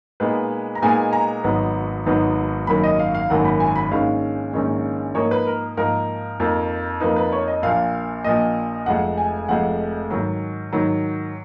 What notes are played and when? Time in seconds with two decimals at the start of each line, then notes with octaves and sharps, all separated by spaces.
0.20 A#2 G#3 B3 D#4 B4
0.75 A#5
0.82 A#2 G#3 B3 D#4 G#5
1.13 A#5
1.44 G#1 G#2 F#3 B3 D#4
2.06 G#1 G#2 F#3 B3 D#4
2.67 G#1 F#2 D#3 F#3 A#3 B5
2.84 D#5
2.99 F5
3.15 F5
3.30 G#1 F#2 D#3 F#3 A#3 F#5
3.45 B5
3.60 G#5
3.76 B5
3.91 A#1 G#2 D#3 G#3 C#4 F5
4.53 A#1 G#2 D#3 G#3 C#4
5.15 G#2 F3 A#3 D#4 C#5
5.31 B4
5.47 A#4
5.77 G#2 F3 A#3 D#4 A#4
6.40 F2 F3 A#3 D#4
7.00 F2 F3 A#3 D#4 B4
7.16 B4
7.32 C#5
7.48 D#5
7.62 A#1 A#2 F3 F5
8.24 A#1 A#2 F3 D#5
8.86 F1 F2 F3 G#3 F#5
9.18 G#5
9.49 F1 F2 F3 G#3 F#5
10.10 G#2 D#3 F#3
10.72 G#2 D#3 F#3